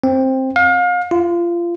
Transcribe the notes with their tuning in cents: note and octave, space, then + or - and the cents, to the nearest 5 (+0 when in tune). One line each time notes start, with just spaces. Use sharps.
C4 +10
F5 +35
F4 -25